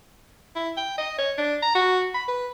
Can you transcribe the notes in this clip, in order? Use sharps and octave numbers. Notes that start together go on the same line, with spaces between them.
E4
G5
D#5
C#5
D4
A#5
F#4
B5
B4